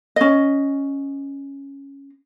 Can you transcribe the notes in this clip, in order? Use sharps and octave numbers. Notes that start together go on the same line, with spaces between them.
C#4 D#5